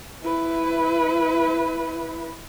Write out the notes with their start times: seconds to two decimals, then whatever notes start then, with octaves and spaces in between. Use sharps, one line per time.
0.23 E4 B4